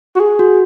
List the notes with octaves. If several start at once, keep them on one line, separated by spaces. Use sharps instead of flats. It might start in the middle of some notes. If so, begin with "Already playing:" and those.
F#4
G#4
F#4